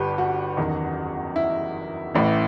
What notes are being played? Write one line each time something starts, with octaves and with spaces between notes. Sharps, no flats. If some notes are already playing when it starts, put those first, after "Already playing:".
Already playing: G1 G2 G4 B4
F#4
F#1 E2 D#3
E4
A1 A2 E3